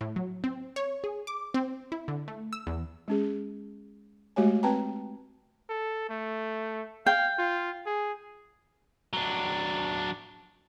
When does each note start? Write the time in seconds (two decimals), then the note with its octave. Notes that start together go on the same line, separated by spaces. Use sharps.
0.01 A2
0.16 F#3
0.44 C4
0.76 C#5
1.04 G#4
1.27 D6
1.54 C4
1.92 E4
2.08 D3
2.28 A3
2.53 E6
2.67 E2
3.08 G#3 C#4 G#4
4.36 G#3 A3 F#4 G4 C#5 G#5
4.63 C4 B4 G5 A5 A#5
5.70 A4
6.09 A3
7.06 F5 G5
7.39 F4
7.86 G#4
9.13 F#3 D4